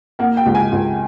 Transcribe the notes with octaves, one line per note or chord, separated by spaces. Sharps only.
A#3 F#5
G5
C#2
G#5
C#2